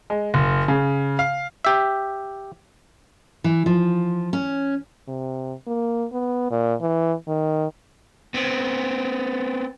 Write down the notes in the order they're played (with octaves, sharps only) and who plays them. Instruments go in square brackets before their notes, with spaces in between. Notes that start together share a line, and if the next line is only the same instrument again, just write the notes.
[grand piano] G#3
F#1
C#3
F5
[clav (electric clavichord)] G4 E5
[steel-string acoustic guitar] E3
F3
C#4
[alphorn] C3
A#3
B3
A#2
E3
D#3
[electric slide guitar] B3 C4